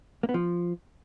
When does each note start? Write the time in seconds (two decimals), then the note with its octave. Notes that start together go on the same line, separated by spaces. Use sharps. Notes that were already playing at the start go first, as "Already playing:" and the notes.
0.23 A#3
0.29 B3
0.34 F3